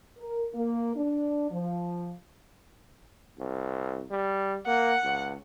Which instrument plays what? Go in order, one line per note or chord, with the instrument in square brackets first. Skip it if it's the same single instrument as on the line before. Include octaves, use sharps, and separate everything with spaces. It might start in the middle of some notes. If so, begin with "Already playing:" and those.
[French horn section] A#4
A#3
D4
F3
[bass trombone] C2
G3
[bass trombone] A#3 [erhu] F#5
[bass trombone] C#2